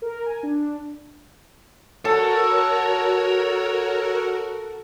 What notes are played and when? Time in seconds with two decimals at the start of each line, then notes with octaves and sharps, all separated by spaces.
0.02 A#4
0.26 G#5
0.43 D4
2.05 F#4 A4 A#4 C#5